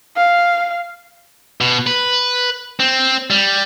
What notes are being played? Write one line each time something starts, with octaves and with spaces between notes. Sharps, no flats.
F5
B2
B4
C4
G3